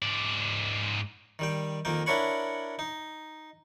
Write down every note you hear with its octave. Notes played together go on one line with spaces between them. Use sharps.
G#2 D5
D#3 G3 G5
F2 D#3 A#3 G5
D4 E4 A#4 C#5 F#5 B5
D#4